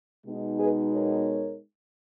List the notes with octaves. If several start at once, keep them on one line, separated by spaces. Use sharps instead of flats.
B2 G#3 B3 D#4
G#4 B4
A#4 C#5